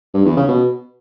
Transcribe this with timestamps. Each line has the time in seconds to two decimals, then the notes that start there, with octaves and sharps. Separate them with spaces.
0.14 G2
0.25 E2
0.37 C#3
0.48 B2